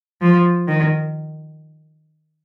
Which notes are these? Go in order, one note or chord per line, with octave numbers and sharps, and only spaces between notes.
F3
D#3